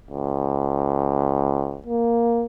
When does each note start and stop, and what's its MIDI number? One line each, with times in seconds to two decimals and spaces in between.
0.11 1.80 37
1.87 2.45 58